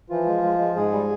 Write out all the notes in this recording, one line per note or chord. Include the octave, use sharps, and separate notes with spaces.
E3 F3 F4
G#3
G#3
G#3
G#2 G#3 G#4
G3